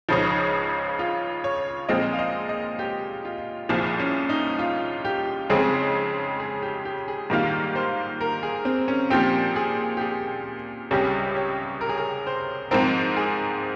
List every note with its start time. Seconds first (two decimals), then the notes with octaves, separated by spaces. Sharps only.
0.09 C#2 C#3 F3 D#4
0.99 F4
1.44 C#5
1.88 A#2 F3 G#3 C4 D#5
2.13 F5
2.19 D#5
2.49 D#5
2.79 G4
3.25 F4
3.69 C2 A#2 F3 G#4
4.00 C#4
4.29 D#4
4.59 F4
5.05 G4
5.50 F2 C#3 G#3 C4 G#4
6.40 G#4
6.62 G4
6.85 G4
7.08 G#4
7.30 G#2 D#3 G3 A#3 F4 A#4
7.76 C5
8.21 A#4
8.43 G#4
8.65 C4
8.88 C#4
9.10 A#2 F3 C4 G4
9.56 G#4
9.97 G4
10.01 G#4
10.91 C#2 C3 G3 C#4 G4 G#4
11.36 C#5
11.81 A#4
11.89 G#4
11.97 A#4
12.27 C5
12.71 G#2 F3 C4 A#4
13.17 G#4